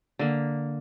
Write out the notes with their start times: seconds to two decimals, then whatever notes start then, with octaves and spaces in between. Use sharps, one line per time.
0.19 D3 A#3